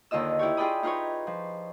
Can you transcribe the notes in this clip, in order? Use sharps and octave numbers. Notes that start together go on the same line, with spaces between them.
D#2 D3 F4 D#5 E6
E4 G4 C#5
F4 G#4 D5 G5 B5 D#6
D#4 F4 B4 C#5
F3